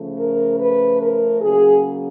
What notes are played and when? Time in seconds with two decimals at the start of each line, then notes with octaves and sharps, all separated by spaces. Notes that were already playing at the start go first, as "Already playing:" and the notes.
Already playing: C#3 F3 A3
0.20 A#4
0.60 B4
1.01 A#4
1.41 C#3 F#3 A#3 G#4